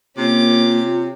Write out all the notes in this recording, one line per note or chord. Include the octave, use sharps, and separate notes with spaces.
C3 A#3 C#4 F4 D6